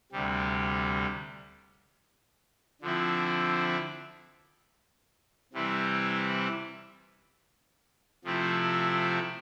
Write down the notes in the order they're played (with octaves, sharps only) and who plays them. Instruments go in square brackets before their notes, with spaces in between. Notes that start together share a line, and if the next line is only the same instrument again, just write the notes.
[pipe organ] D2 C3 G3
D3 F3 C4 E4
C3 E3 G3 C4 E4
C3 F3 A3 C4 E4